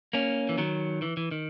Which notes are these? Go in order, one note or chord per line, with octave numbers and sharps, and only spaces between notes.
A#3 C#4
E3
D#3 F#3
E3
E3
D#3